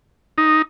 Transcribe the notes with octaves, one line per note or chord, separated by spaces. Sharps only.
D#4